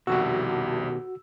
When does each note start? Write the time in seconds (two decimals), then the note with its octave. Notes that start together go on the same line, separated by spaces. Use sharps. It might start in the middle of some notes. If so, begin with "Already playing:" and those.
0.07 C2 F2 B2 D#3 F#4 G4 E6